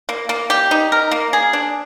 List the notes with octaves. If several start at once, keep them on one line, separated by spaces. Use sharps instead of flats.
A#3
A#3
G4
D#4
A#4
A#3
G#4
D4